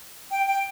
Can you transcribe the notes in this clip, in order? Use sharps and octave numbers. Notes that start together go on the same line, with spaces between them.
G5
G5